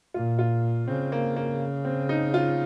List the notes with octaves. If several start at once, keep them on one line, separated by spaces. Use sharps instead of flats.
A#2 F4
F4
C#3 C4
A#3
A#3
C4
D#4
F4